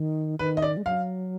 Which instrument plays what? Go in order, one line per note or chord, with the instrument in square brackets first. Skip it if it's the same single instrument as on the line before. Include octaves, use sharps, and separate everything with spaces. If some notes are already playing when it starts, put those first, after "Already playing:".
Already playing: [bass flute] D#3
[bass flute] D#3 [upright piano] B4
[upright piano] D#5
D5
[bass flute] G#3
[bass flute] F#3 [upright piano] F5